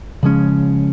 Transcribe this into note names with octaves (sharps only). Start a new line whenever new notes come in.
C#3 F3 G#3 C#4